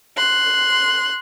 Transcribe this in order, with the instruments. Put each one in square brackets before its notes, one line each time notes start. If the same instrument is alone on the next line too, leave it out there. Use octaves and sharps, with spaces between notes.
[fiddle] C6 F#6